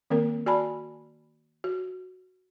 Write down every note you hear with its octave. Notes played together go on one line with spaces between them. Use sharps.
D#3 A#3 C4 A#4
F#4 D5 G#5 A5 B5
F#4